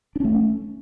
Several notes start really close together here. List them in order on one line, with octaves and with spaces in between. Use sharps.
D4 C#4 A3